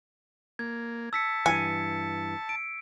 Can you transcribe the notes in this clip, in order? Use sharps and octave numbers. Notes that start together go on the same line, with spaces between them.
A#3 G#6
A5 E6 B6 C#7
G2 E3 G#5 C#7
D7